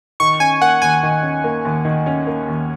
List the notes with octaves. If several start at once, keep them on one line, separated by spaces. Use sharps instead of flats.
D#3 C#6
C#4 G#5
A#3 F#5
D#2 G#5
D#3
C#4
A#3
D#2
D#3
C#4
A#3
D#2